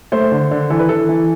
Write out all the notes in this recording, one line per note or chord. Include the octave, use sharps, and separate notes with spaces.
A3 C5
D3
D3
E3 A4
B4
E3 A4
E3